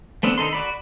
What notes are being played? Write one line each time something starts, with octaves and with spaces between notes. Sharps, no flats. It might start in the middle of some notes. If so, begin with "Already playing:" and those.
A3 B3 C4 D4
D#3 D#4 A4 C6
F#4 D5 B5